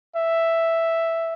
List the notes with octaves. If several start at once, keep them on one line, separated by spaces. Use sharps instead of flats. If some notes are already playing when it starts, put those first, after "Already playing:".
E5